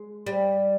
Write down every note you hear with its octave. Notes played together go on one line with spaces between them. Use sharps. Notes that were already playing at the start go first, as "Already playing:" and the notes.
Already playing: G#3
G3